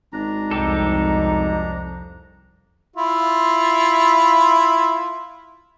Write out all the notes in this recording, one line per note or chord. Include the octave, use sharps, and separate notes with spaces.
G#1 D4 A#5
C2 F2 D#4 G4 A4
E4 F4